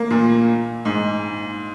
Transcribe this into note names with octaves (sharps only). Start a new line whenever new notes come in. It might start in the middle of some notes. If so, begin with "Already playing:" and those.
Already playing: A#3
A#2
G#2